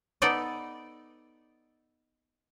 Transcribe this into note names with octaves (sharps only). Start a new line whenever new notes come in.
B3 D#4 A4 D5 D#5